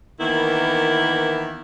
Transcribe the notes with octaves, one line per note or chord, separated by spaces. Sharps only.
D#3 E3 A#3 B3 E4